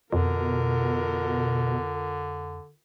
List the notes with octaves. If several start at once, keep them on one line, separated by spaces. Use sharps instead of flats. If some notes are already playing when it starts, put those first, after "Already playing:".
F2 B2 D3 F4 A#4